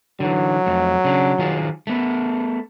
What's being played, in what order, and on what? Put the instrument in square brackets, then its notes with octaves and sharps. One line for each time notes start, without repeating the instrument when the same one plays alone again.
[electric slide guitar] D3 E3 [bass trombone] F#3
[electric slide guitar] F2 A3
C#3 D4
D#3 F4 G#4
A3 B3